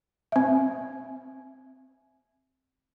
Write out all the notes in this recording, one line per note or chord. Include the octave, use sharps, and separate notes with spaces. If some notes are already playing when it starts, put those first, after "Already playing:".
C4 E5